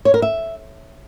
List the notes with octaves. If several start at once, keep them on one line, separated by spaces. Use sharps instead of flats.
C#5
A#4
E5